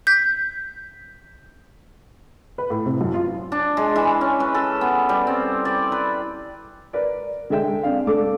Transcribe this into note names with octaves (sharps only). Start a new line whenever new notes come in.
G6 B6
B4
A2
C3
F#2
F4
D4
G#3
E3
C#4
B4
A4
B3
G3
C4
D5
B4
A#4 B4 D5
D3 G#3 A4 E5 G5
C4 D4 F5
A3 D4 A4 D6